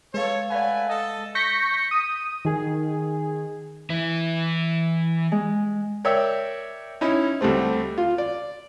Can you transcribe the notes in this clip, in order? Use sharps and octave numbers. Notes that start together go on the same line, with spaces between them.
G#3 A4 B4 C#5 F5
A3 B4 D5 F5 F#5 G#5
A4 D#5
C#6 G6 A#6 B6 C#7
D#6
D#3 G#4
E3 E4
G#3
A#4 C#5 D5 E5 G5 E6
C#4 D#4 E4
D2 G3 A3 C4
F4
D5